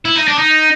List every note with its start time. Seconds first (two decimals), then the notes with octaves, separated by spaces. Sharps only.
0.05 E4
0.16 D#4
0.28 D4
0.38 D#4